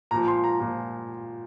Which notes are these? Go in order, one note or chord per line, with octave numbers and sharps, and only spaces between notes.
A#2 F3 A#5
C6
A#5
A#2 F3